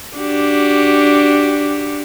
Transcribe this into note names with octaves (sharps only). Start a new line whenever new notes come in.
D4 F#4 G4